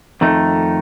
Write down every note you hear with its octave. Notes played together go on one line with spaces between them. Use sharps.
F2 D#3 A3 D#4